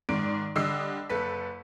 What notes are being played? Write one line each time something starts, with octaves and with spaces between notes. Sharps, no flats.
G#2 D#3 D5 D7
D3 G3 D#5 E6 C7
F#1 A4 B4 B6